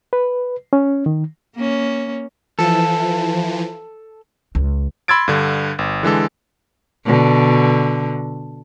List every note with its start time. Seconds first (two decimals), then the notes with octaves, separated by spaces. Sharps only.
0.13 B4
0.73 C#4
1.06 D#3
1.56 A#3 C#4
2.59 E3 F3 A4
4.55 C#2
5.08 B5 C6 E6 G#6 A6 D7
5.28 G2 D3
5.79 G1
6.03 D3 E3 G#3 A4
7.05 B2 D3